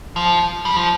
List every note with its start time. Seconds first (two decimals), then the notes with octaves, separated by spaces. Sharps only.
0.16 F3
0.65 G3
0.76 F3